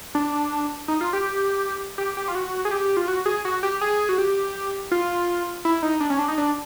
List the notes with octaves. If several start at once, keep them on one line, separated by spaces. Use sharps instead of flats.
D4
D#4
F4
G4
G4
G4
F4
F#4
G#4
G4
F4
F#4
G#4
F#4
G4
G#4
F#4
G4
F4
E4
D#4
D4
C#4
D4
D#4
D4